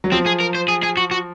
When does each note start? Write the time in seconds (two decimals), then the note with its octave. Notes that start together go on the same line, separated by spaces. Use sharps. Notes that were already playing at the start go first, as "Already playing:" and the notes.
0.04 F#3
0.12 F3 C4
0.26 G#4
0.40 A#4
0.55 C5
0.68 G#4
0.83 G#4
0.97 F#4
1.11 F#4